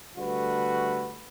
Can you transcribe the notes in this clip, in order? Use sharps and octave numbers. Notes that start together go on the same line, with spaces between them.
D3 G3 A3 F#4 B4